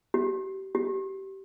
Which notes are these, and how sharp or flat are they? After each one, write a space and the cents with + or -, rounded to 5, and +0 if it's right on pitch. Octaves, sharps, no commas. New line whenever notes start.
G4 -35
G4 -25